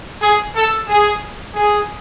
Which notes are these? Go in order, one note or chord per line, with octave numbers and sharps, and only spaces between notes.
G#4
A4
G#4
G#4